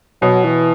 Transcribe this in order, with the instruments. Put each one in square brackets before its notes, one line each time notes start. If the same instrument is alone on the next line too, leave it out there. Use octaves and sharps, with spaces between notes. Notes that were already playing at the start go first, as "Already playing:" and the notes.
[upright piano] B2 [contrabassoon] F#3
[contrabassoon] E3